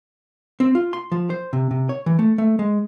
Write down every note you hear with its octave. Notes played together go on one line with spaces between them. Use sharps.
C4
F4
C6
F3
C5
C3
C3
C#5
E3
A3
A3
G#3